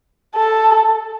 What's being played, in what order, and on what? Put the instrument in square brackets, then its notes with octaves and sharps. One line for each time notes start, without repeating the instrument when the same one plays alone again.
[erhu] A4